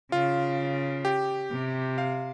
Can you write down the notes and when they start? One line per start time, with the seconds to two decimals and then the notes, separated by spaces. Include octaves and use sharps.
0.12 C#3 F4
1.05 G4
1.51 C3
1.98 F5